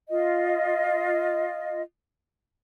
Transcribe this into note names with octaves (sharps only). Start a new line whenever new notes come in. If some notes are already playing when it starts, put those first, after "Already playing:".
F4 D#5